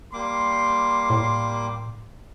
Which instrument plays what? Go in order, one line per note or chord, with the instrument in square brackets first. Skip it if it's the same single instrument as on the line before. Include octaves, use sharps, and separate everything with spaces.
[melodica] G3 A#3 D6 [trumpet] C6
[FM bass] A2